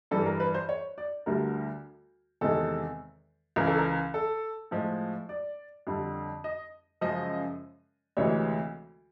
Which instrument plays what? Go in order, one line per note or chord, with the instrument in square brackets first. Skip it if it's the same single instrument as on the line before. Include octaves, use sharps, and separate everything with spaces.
[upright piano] G2 E3 G3 A4
A#4
B4
C5
C#5
D5
D2 D3 G3 A#4
E2 C3 D#3 G#3 A4
C#2 C#3 E3 A#4
A4
A#4
A4
A2 F3 G#3
D5
F2 D3 G3
D#5
F#2 C#3 F3 G#3 D#5
D2 C3 E3 G#3 C#5